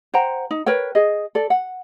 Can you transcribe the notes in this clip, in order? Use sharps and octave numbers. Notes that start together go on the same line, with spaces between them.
C5 F#5 G5 A#5
D#4
A#4 B4 C#5 G5
G#4 D#5
A4 D5
F#5